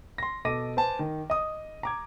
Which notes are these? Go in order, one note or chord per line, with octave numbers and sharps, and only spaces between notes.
C6 A#6
B2 A4 D#5 D6 A#6 D#7
B4 C5 G#5 A5
D#3
D#5 D#6
A#5 D6 G#6